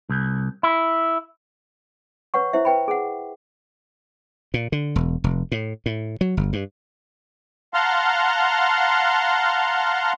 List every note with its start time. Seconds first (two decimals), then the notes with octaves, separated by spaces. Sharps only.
0.09 C2
0.63 E4
2.34 B4 C#5 F#5 C#6
2.53 E4 C5 E5
2.65 B4 G5 B5
2.88 G#4 F#5
4.54 A#2
4.72 D3
4.96 E1
5.24 F1
5.52 A2
5.86 A2
6.21 F#3
6.37 G1
6.53 G2
7.74 F5 F#5 A5 A#5 C6 F6